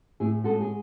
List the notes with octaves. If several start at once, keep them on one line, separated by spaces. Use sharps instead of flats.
A2 E4 G#4
G#3 F#4 A4
G#4